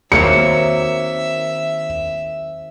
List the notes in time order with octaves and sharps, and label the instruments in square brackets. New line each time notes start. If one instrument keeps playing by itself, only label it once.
[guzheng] D#3 C4 C#5 [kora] F#3 A#3 [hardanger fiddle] E5 [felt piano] C#7